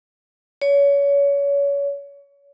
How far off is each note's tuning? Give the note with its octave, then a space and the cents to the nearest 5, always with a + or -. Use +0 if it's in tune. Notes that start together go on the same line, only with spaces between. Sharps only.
C#5 +30